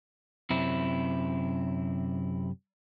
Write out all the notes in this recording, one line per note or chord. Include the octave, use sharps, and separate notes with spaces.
F#2 C3 C4 E4